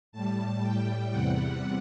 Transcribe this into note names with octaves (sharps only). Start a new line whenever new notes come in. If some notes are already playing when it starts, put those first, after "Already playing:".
A2 G3 A5
A2 G3 G5
E2 C3 G3 F#5